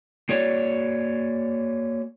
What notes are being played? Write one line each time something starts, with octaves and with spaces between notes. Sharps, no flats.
A#3 F#4 C#5 D5